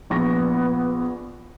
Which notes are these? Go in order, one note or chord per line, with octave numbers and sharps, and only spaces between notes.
A#1 B3 C#6 A#6